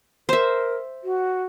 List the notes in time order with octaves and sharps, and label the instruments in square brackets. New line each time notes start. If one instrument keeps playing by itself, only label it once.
[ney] A#4 [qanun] C5 E5
[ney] F#4